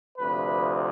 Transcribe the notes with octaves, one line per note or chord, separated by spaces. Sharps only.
D2 C3 F3 B4